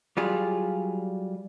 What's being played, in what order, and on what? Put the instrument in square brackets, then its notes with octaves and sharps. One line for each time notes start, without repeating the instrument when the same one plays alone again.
[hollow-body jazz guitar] F#3 G3 F4 G#4